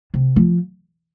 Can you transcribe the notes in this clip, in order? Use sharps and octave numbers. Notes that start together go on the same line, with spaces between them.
C3
F3